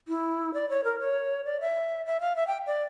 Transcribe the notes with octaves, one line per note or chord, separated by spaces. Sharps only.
E4
D5
C#5
A#4
C#5
D5
E5
E5
F5
E5
G5
D5